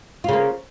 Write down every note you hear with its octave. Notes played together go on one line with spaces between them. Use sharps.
C#3 A#3 F4